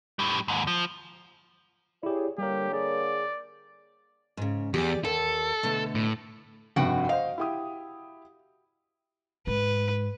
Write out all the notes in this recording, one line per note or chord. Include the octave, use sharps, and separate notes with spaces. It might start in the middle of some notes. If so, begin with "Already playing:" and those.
A2 G3
D#2 G#2
F3
E4 G4 G#4 C#5 D5
D3 G3 A#3 G4 A#4 C#5
G#4 D5
G#2 C#3
E2 G4 G#4 D5
D#2 A4
B2 D3 A3
A2
F1 G2 C3 F#4 F#5 G5
C5 D#5 F5
E4 G4 D#6
G#2 B4